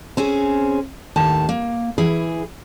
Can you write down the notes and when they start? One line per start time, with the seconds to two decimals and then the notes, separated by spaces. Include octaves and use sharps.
0.17 C4 C#4 G#4
1.16 D#2 A2 D#3 A5
1.49 A#3
1.98 E3 E4 G#4